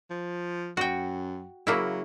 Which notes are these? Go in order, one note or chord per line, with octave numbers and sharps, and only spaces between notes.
F3
F#2 F#4 G5
C#3 F#3 A#3 E4